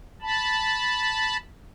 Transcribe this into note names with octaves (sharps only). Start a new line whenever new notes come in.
A5 B5